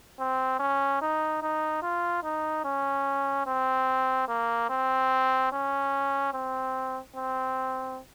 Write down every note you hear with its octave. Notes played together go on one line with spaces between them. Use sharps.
C4
C#4
D#4
D#4
F4
D#4
C#4
C4
A#3
C4
C#4
C4
C4